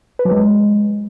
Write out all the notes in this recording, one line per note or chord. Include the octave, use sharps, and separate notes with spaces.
B4
F#3
G#3